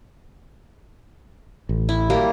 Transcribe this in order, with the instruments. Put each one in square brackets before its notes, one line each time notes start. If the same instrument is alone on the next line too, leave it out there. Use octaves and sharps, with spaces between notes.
[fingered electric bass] A1
[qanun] E4
G3 A#3